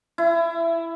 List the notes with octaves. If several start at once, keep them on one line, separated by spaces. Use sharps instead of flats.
E4